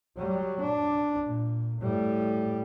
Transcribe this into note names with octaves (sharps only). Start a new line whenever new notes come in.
F#3 G3
D4
A#2
A2 G3